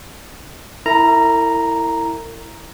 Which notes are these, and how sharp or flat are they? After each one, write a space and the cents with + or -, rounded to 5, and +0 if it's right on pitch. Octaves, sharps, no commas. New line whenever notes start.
E4 +0 A#4 -45 A#5 +0